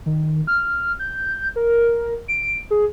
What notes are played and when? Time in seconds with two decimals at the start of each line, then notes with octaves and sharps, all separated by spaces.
0.06 D#3
0.47 F6
0.99 G6
1.56 A#4
2.28 D7
2.71 G#4